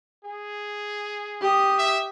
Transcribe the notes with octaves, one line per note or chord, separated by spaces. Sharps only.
G#4
G4 D#6
E5